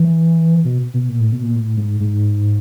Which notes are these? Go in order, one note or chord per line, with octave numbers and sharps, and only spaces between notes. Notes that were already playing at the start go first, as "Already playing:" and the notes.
Already playing: E3
B2
B2
A#2
A2
B2
A#2
A2
G#2
G#2